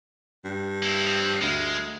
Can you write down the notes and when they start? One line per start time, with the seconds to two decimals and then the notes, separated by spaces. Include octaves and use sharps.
0.44 G2
0.83 A#3 E4
1.06 F3 C4
1.42 D2 G#3